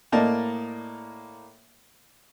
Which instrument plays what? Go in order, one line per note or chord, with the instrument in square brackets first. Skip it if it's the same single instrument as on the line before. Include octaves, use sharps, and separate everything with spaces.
[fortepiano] A2 A#3 D5 D#5 A5 A#5